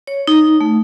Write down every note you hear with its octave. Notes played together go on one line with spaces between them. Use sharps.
C#5
D#4
A3